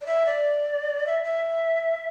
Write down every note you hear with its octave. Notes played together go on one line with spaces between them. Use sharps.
D5
E5
D5
E5
E5